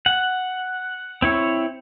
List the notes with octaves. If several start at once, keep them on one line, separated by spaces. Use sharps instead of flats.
F#5
C4 E4 C#5